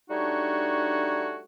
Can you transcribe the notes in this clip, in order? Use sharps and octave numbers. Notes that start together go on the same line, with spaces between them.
G3 A3 D4 D#4 F#4 C#5